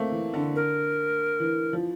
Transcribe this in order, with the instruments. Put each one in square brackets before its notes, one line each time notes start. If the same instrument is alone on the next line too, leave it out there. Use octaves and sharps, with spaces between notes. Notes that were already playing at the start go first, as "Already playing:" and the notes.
Already playing: [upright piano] A3 A#3 C4
E3
D3
[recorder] A#4
[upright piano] E3
F3